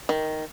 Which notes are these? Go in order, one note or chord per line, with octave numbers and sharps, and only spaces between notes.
D#3